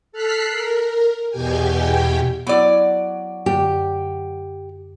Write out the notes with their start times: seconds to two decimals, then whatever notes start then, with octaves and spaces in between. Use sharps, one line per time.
0.12 A4 F6 F#6 B6 C7
0.49 A#4
1.30 E2 B2 G4 G5 G#5
2.47 F#3 B3 E4 D5
3.46 F#2 D3 G4